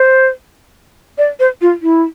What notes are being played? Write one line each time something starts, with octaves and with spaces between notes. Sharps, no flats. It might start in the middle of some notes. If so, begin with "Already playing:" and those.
Already playing: C5
D5
C5
F4
E4